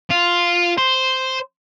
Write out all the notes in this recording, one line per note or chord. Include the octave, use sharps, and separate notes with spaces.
F4
C5